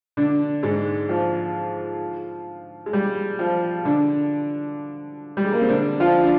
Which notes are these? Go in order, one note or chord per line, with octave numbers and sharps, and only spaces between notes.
D3 D4
G#2 G#3
F3
G#3
G3
F3
D3 D4
G3
G#3
A#3
C4
D3 D4
F3 F4
D4